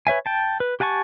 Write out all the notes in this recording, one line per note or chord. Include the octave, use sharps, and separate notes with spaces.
B4 C#5 E5 G#5
G5 A5
B4
G4 F#5 G#5 A5 C#6